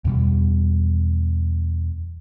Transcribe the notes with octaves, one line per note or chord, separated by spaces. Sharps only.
E2 B2 G3